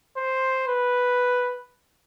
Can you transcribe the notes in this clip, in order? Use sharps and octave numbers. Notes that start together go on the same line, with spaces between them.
C5
B4